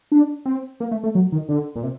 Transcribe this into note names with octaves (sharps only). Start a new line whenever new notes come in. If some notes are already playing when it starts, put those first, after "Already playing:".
D4
C4
A#3
A3
A3
F#3
D#3
D3
A#2
C3